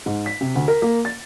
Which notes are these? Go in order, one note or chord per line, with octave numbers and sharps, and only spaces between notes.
G#2
B6
C3
D2
A#4
A#3
A6